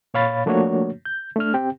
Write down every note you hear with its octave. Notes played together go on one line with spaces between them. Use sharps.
A#2 C#5 F5 B5 A6
F3 A3 A#3 D4 F#4 C#5
G6
A3 D4 F6
C4 G4 G5